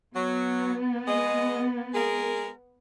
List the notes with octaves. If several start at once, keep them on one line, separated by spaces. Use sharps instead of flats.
F#3 B3
G#3 D#5
G#3 G#4 A#4